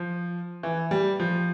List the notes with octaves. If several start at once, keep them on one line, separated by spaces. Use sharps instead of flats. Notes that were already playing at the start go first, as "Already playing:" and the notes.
Already playing: F3
E3
G3
F3